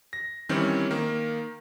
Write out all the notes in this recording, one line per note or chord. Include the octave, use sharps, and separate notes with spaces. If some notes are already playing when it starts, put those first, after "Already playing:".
A#6
D#3 E3 G3 C4 C#4
D#3 A#3